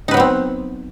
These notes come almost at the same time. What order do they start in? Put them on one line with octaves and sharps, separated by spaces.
D#4 B4 F#3 B3 C4